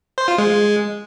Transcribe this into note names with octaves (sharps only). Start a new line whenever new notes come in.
C5
F4
G#3